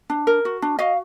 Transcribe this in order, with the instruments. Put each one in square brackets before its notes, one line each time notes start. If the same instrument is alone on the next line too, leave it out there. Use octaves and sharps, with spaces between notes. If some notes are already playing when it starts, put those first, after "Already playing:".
[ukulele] D4
A#4
F#4
D4
F#4 D#5 F5